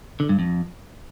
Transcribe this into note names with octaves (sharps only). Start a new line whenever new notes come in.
D3
G2
F2